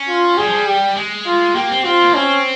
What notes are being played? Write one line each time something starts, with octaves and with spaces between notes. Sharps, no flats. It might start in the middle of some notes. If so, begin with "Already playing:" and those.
Already playing: C#4
F4
G3 G#4
F3
G3
G4
G#3
F4
A#3 G4
C4
C4 F4
A#3
C4 C#4